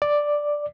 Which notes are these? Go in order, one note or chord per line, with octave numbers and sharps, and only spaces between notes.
D5